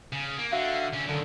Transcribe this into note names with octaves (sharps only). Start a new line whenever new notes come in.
C#3
A#3
D3 F#4 E5 F5
D3 C#4
F#2 D3 D#3